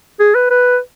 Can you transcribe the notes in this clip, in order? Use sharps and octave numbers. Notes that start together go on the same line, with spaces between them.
G#4
B4
B4